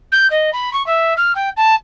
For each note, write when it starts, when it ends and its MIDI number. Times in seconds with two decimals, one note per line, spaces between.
0.11 0.27 91
0.30 0.50 75
0.52 0.72 83
0.73 0.84 85
0.86 1.13 76
1.16 1.32 89
1.35 1.49 79
1.56 1.74 81